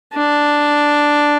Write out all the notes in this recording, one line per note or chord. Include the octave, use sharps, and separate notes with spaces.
D4